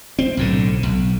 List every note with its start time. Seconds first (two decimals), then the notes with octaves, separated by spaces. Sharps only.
0.19 C4
0.37 B1 A2 D3
0.83 B1